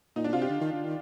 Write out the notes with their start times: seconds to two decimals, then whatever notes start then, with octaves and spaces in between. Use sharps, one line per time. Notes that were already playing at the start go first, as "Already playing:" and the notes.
0.16 A#2 D#4
0.24 D4
0.28 A#2
0.33 C3 F4
0.42 G4
0.49 D3
0.61 D#3
0.73 D3
0.84 D#3